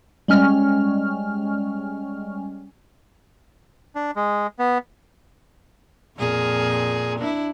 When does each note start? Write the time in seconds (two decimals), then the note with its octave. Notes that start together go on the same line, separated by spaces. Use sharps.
0.28 G3 G#3 C#4 F6
3.95 D4
4.16 G#3
4.59 B3
6.17 F2 A#2 G#4
7.19 D4 E4